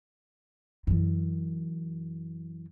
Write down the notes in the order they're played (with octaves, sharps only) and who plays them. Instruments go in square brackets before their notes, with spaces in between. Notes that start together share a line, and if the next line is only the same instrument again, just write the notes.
[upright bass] F#2 E3